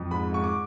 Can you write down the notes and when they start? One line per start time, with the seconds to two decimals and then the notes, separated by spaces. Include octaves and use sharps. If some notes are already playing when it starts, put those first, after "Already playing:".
Already playing: F2
0.11 G#2 B5
0.33 G#2 C#6
0.44 D6